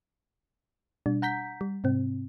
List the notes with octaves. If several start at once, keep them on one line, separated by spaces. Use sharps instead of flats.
B2 G3 D4
F#5 A#5 G6 B6
G3
G#2 C3 C4